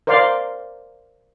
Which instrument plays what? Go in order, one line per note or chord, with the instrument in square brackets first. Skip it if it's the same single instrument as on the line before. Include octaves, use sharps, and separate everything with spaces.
[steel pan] A#4 C5 D5 F5 C6